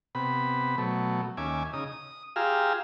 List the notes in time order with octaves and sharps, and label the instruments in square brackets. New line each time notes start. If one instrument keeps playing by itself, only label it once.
[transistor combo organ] C3 B3 B5
B2 F#3 A3
D#2 C#4 E5 G#5 D6
C#3 D#4 D#6
D#6
F4 G4 G#4 F5 A#5 E6